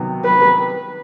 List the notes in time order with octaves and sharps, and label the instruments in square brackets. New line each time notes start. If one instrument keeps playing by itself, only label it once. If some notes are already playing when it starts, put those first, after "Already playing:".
Already playing: [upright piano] C3 D#3 F#3 B3
[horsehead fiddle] B4